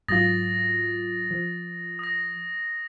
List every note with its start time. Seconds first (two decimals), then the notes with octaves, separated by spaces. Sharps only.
0.08 G#2 F#3 F4 D#6 A6 A#6
1.31 F3
1.99 D#6 A#6